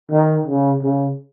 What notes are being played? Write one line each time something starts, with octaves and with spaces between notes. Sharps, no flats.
D#3
C#3
C#3